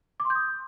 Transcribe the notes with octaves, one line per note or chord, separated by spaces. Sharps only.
D6
C6
G6
D#6